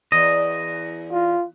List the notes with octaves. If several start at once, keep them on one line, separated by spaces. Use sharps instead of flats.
E2 D#5
F4